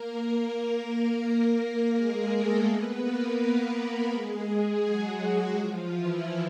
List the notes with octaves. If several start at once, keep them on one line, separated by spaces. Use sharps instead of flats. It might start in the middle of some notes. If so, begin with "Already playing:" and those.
Already playing: A#3 A#4
A#3 A#4
G#3 G#4
A3 A4
B3 B4
A#3 A#4
G#3 G#4
F#3 F#4
F3 F4
E3 E4